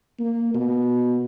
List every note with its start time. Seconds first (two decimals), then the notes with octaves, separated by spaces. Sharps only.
0.19 A#3
0.54 B2